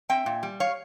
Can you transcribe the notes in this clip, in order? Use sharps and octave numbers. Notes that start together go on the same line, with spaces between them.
C4 E5 G5
A#2
G3
C#5 F5